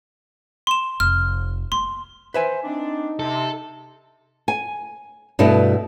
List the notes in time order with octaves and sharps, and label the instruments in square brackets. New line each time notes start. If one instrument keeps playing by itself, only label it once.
[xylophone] C6 E7
[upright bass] F1 [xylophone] F6
[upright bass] A#3 [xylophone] C6
[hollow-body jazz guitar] B4 E5 G#5 [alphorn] C5
[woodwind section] C4 D4 [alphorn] D#4
[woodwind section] C3 [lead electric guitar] A4
[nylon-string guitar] G#5
G2 B2 A3 B3 E4